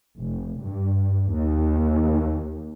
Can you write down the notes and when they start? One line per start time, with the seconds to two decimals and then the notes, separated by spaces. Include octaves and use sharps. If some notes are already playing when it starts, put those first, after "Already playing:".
0.19 F1
0.62 G2
1.34 D#2